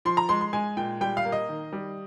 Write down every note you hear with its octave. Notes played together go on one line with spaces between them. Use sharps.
F3 C6
A#5
G#3 C6
C6
G#3 G#5
A#2 G5
G3 G5
F5
A#3
D#5
D#3
G3